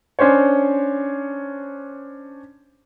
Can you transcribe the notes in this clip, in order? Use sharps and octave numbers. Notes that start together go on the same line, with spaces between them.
C#4 D4 C5 C#5